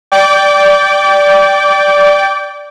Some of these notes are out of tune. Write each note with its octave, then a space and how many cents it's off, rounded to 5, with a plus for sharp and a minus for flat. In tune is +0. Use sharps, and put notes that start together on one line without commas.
D5 -5 G5 +0 D6 -30